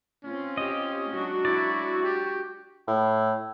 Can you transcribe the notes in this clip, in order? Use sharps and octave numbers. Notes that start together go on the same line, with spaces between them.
C4 C#4 F4
G4 D#5
F#3 G#3 D4 F#4
E4 D5
G4
A2